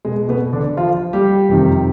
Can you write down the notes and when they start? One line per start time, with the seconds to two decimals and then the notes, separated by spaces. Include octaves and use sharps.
0.05 B2 G#3
0.29 B2 B3
0.53 D3 D4
0.77 F3 F4
1.13 G3 G4
1.49 F2 C3 D#3